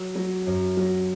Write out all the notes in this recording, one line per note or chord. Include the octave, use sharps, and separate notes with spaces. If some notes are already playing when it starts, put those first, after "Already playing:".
Already playing: F#3
F#3
F#2
F#3